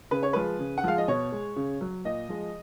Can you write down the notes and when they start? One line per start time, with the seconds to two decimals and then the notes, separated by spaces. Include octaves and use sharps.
0.11 C#3 B4
0.23 C#5
0.33 F3 G#3 B4
0.59 C#3
0.78 F#5
0.84 F3 G#3 F5
0.98 D#5
1.08 B2 C#5
1.32 G#3
1.56 C#3
1.81 F#3
2.05 A#2 D#5
2.29 F3 G#3